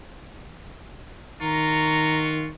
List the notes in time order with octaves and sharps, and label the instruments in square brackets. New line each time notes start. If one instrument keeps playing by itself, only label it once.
[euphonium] D#3 [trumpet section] F4 F#4 C#6 [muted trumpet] A#5